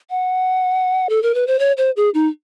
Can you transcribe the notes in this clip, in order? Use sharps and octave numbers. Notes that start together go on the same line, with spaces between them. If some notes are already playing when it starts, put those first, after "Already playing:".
F#5
A4
A#4
B4
C5
C#5
C5
G#4
D#4